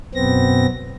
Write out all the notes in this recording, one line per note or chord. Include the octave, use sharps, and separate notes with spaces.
F#2 B2 B3 C4 A#6